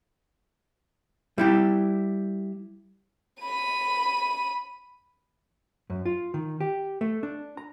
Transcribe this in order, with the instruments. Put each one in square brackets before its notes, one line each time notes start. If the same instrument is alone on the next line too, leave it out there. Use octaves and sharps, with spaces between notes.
[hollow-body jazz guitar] G3 E4 G4
[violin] B5 D#7
[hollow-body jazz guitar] F#2
F4
D#3
G4
A3
D4
A#5